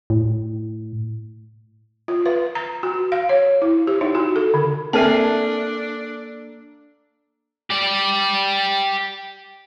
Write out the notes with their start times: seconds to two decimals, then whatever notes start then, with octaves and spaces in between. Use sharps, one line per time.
0.10 A2
2.08 F4
2.26 B4
2.55 A#5
2.83 F#4
3.12 F5
3.29 C#5
3.62 E4
3.87 G4
4.01 D#4
4.15 F#4
4.36 A4
4.54 D3
4.93 A#3 C4 D4 A4 A#4 E5 G#5 A5
7.70 G4 D5